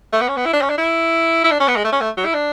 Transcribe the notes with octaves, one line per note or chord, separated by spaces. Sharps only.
A3
B3
C#4
B3
E4
D4
C#4
D4
E4
E4
D4
C#4
B3
G#3
A3
C#4
A3
F#3
E4
D4